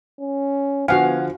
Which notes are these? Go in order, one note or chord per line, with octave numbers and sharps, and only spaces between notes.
C#4
D3 F3 B3 F#4 F5 F#5 G#5